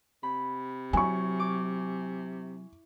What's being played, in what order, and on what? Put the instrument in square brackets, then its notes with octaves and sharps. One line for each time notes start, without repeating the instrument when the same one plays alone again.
[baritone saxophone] C3 [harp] B5
[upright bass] F#3 [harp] E4 [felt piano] G#5 C#6
[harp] D6